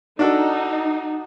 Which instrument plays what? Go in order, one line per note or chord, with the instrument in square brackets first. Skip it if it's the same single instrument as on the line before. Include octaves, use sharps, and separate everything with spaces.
[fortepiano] D4 F#4 A4 [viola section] D#4